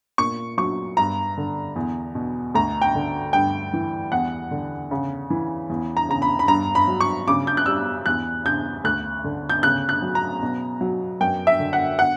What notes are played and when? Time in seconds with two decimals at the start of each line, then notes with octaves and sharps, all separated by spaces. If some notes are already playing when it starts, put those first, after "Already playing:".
0.18 A#2 C#6
0.58 F#3 C#6
0.97 G2 A#5
1.37 D3
1.76 E2
2.15 B2
2.54 D2 A#5
2.82 G5
2.95 D3
3.33 G2 G5
3.73 E3
4.12 E2 F#5
4.51 D3
4.91 C#3
5.30 E3
5.70 E2
5.97 A#5
6.09 C#3 A#5
6.22 B5
6.39 B5
6.48 G2 A#5
6.75 B5
6.88 F#3
7.01 C#6
7.27 C#3 D6
7.47 G6
7.57 F#6
7.66 G3 E6
8.06 E2 F#6
8.45 C#3 G6
8.84 D2 F#6
9.24 D3
9.49 G6
9.63 C#3 F#6
9.89 F#6
10.02 F#3
10.15 A#5
10.43 B2
10.81 F#3
11.21 F#2 G5
11.47 E5
11.60 D3
11.73 F#5
11.99 F#5